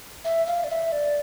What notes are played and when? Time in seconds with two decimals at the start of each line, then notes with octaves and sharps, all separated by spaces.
0.25 E5
0.47 F5
0.64 D5
0.70 E5
0.92 D5